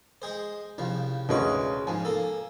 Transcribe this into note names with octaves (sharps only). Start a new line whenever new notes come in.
G#3 G#4 C5
C2 C#3 F3
D2 A#2 G#3 C#4 B4 C#6
G#2 F3 G#5
A#3 A4